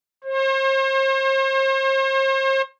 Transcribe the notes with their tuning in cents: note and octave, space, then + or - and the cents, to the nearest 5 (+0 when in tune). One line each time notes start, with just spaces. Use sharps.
C5 +40